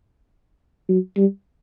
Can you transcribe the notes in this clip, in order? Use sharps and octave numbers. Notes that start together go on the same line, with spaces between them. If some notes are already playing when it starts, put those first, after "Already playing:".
F#3
G3